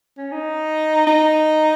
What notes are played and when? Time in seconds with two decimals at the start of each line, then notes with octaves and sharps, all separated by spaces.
0.17 C#4
0.32 D#4
1.07 D#4